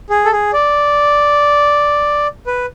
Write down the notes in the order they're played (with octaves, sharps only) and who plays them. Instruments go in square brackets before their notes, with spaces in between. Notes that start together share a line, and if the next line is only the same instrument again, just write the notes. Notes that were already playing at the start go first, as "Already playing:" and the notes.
[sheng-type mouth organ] G#4
A4
G#4
D5
B4